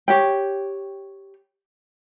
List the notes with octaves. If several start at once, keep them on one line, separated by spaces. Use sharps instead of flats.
G4 C#5 G5